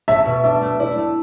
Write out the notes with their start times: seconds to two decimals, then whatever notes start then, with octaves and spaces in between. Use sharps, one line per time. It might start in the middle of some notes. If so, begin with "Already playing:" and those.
0.08 A3 E5
0.25 B2
0.44 D4 E5
0.62 A3
0.80 E4 D5
0.98 A3